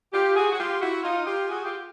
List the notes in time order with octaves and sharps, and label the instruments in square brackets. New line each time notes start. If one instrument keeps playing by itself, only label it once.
[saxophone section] F4 G4
F#4 G#4
F#4
F4 G4
E4 F#4
D#4 F4
F4 G4
F#4 G#4
F4 G4